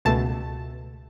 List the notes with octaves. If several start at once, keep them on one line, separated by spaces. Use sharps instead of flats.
C#2 B2 A3 A5